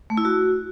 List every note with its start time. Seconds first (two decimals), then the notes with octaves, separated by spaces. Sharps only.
0.10 A3
0.17 E4
0.25 F#4